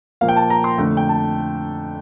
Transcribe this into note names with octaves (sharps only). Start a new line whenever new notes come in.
A#2 F3 A#3 F5
G5
A5
A#5
C6
F2 D3 A3
G5
A5